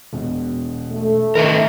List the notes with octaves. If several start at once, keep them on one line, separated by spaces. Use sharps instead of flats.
E1 B2
A3
D#3 A#4 B4 E5 B5